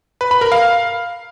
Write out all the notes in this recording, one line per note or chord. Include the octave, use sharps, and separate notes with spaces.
B4
B5
A#4
F5